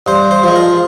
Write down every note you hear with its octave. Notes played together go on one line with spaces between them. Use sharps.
G2 C5
C5
F3 G#3
A#4